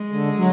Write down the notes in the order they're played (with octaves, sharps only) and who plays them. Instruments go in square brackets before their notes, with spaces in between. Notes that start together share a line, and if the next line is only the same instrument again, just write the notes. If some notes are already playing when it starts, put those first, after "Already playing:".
Already playing: [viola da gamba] G#3
[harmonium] D3
F#3